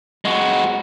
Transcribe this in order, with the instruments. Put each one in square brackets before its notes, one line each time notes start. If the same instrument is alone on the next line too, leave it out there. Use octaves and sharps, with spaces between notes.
[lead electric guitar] G#3 F#4